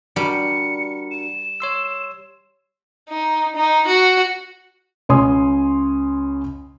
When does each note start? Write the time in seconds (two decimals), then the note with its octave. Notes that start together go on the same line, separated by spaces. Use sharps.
0.16 G3 D4 F#4 A#4 C#7
1.11 E7
1.60 C#5 C6 E6
3.09 D#4
3.56 D#4
3.88 F#4
5.09 C#2 C#5 G#5 C6 D#6